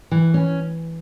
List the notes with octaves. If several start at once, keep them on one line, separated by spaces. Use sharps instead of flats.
E3
C#4